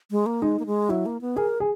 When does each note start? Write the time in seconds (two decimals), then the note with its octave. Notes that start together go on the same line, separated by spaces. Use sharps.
0.11 G#3
0.26 A#3
0.42 G#3 D#4
0.59 A#3
0.66 G#3
0.89 F#3 E4
1.06 A#3
1.21 B3
1.37 G#4 A#4
1.60 G#4